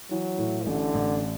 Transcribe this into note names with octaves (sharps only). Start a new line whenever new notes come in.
E3 F#3
A2
A1 D3
A1